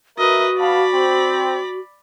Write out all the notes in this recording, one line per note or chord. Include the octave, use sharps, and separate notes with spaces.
F#4 A#4 B4 D#5 E5
B3 D5 F5 A5 B5
C4